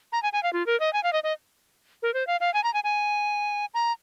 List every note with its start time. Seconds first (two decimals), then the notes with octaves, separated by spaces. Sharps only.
0.12 A#5
0.23 G#5
0.33 G#5
0.43 F5
0.53 F4
0.66 A#4
0.80 D#5
0.93 G#5
1.03 F5
1.13 D#5
1.24 D#5
2.03 A#4
2.14 C5
2.27 F5
2.40 F5
2.54 G#5
2.64 A#5
2.74 G#5
2.84 G#5
3.74 A#5